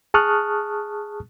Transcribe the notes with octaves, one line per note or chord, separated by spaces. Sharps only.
G#4 A5 C#6 D#6 F6 F#6